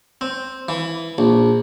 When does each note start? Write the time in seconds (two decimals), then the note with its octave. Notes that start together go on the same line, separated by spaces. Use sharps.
0.21 C4
0.69 E3
1.18 A#1